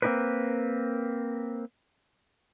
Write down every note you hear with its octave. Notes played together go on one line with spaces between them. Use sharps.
A#3 C4 D#4 G4 A#4 B4